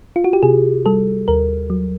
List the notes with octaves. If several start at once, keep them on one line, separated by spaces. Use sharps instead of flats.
F4
F#4
G4
C3 G#4
G3 A4
D#2 A#4
F#3